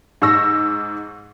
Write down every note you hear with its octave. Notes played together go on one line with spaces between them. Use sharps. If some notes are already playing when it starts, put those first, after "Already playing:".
G#2 C#6 E6 A#6